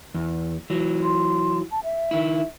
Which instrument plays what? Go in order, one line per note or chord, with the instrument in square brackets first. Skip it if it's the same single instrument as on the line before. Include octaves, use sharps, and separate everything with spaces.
[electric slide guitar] E2
E3 F#3
[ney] C6
A5
E5
[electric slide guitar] D#3 E4